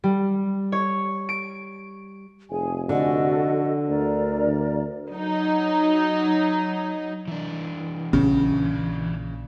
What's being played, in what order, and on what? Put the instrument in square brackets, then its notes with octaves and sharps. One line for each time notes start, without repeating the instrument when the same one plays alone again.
[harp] G3
C#5
D7
[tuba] F1 [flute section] G#4 G#5
[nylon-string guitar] D3 [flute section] F#4 A4 D#5
[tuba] D2 [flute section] A#4 D5 A#5
[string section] F#3 D#4
[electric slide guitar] E3 D4
[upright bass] A#1 [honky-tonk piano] C#3